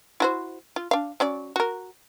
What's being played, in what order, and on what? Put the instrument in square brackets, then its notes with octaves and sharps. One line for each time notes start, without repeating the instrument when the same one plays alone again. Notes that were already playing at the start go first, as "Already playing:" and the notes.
[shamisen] E4 F#4 C5
F4
D4 F5
F#3 C#4 D5
F#4 A#4